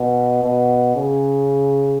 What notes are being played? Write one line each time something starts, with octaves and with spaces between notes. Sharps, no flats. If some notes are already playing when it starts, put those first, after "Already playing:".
Already playing: B2
B2
C#3